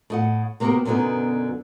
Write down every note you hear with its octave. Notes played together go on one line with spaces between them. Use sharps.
A2 D#5 F#5
C3 A#3 B3 F#4 G4 A#4
F#2 B2 D3 G3 B3 D#4